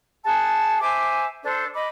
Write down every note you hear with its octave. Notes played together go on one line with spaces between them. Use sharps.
G#4 F#5 A5
C5 E5 G#5 D6
D4 A4 C5
D#5 B5 D6